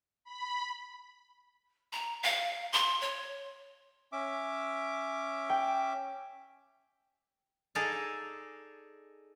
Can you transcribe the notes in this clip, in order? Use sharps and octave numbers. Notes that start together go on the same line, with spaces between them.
B5
A#5
F5
C6
C#5
C#4 E5 D6
G5
D#4 G#4 A4 D5 F5